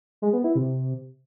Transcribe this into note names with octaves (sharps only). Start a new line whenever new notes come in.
G#3
B3
E4
C3